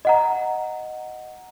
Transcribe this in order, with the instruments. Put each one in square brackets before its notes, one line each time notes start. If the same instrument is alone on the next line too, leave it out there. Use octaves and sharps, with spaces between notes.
[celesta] D#5 F#5 A#5